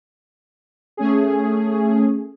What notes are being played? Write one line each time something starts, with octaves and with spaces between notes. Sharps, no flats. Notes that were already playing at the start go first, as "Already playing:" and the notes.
A3 C#4 G#4